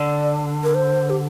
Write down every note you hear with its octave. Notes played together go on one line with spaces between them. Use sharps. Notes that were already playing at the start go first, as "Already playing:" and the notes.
Already playing: D3 D5
A#4
C5
G4